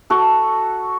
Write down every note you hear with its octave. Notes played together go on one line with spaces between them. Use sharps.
F#4 A4